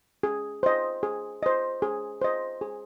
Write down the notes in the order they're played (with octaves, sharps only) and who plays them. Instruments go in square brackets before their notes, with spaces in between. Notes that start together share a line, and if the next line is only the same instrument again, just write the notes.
[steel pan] G#4
C5 D#5
G#4
C5 D#5
G#4
C5 D#5
G#4